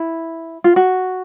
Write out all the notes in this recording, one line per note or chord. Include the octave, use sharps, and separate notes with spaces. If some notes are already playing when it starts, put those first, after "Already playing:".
Already playing: E4
F4
F#4